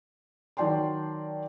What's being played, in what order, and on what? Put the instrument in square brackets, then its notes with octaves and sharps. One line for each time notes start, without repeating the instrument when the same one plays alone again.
[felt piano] D#3 F#3 D5 G5 A5 C6